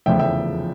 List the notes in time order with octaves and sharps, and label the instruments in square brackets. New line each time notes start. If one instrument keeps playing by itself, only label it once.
[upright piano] F1 E2 C#3 F3 E5 G5
E5 G5